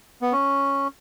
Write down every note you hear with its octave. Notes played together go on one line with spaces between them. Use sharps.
B3
C#4